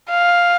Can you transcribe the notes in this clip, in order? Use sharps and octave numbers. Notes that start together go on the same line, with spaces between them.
F5